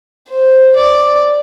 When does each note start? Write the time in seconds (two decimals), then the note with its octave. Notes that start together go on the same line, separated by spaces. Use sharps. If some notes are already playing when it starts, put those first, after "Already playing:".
0.28 C5
0.76 D5